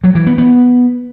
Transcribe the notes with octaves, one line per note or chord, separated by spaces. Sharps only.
F#3
E3
B3
B3